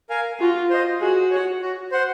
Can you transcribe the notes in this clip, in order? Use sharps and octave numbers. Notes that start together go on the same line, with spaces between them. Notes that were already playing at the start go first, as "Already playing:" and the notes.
A#4 F5 G#5
F4 F#4
C5 D#5
F#4 G#4
C#5 F#5
F#4
C5 F#5